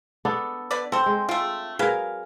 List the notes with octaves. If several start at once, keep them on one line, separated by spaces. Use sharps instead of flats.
B3 D4 A4
D3 B4 D5
C4 A4 C5
G#3
A3 F4 G5
F#3 G#4 A#4 B4 F5